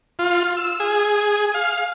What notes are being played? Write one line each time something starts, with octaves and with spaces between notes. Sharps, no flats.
F4
E6
G#4
F5